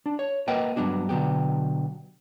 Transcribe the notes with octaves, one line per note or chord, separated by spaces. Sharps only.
D4
C#5
A#3 A#4 B4 D#5 F#5 G5
G2 C3 F#3 B3 D4 F#4
B2 D3 F#3 B3 G4